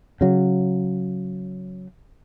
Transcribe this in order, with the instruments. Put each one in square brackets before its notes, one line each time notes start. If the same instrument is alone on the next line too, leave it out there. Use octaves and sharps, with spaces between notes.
[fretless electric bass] C#3 F#3